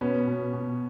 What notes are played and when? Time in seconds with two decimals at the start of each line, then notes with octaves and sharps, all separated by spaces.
0.01 B2 B3 C#4
0.27 B2
0.53 B2